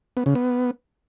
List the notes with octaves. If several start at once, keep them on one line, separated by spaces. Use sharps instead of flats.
B3
C#3
B3